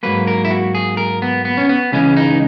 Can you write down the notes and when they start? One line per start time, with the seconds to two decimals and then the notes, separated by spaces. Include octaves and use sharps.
0.03 G#2 F#3 A#3 B4
0.27 A#4
0.45 E4
0.51 F#4
0.75 G#4
0.97 A#4
1.22 B3
1.45 B3
1.57 C#4
1.69 B3
1.92 C#2 C#3 E3 G#3 C#4
2.17 D#4